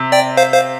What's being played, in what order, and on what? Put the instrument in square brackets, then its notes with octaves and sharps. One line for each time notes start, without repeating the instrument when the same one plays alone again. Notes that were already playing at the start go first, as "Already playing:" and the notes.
Already playing: [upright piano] C3
[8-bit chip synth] D5 G5
C5 F5
C5 F5